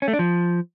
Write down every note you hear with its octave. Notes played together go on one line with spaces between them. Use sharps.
C#4
A3
D4
F3